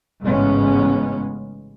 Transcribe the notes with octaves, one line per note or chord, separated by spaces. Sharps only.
A1 G#2 C#3 G#3 B3 C#4